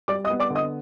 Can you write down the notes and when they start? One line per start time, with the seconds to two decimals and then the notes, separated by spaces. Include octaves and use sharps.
0.08 G3 D5 D6
0.25 D#5 D#6
0.30 B3
0.40 D5 D6
0.50 D3
0.55 D#5 D#6